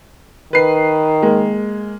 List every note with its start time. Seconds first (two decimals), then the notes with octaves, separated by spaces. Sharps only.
0.53 D#3 B4 C7
1.22 G#3 A#3